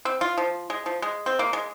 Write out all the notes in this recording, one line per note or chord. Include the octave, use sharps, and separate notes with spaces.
C4
F4
F3
G#3
F3
G#3
C4
A#3
G#3